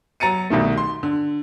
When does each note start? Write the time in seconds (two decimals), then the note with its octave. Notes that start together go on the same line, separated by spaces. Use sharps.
0.20 F#3 A#5 A6 C#7 D#7
0.50 C2 B2 D#3 A3
0.78 C6
1.03 D3